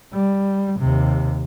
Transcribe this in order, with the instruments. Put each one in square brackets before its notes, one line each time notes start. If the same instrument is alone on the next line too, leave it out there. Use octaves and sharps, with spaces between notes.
[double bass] G3
D#2 C3